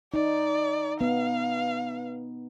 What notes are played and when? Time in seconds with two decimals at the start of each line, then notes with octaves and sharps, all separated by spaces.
0.14 D#4 D5
1.01 B3 F5